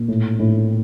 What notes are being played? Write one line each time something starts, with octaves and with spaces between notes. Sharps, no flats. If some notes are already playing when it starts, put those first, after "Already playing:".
Already playing: A#2
A2
A2